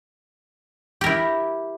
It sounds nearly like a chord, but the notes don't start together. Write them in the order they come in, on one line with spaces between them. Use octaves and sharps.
G4 A#4 E4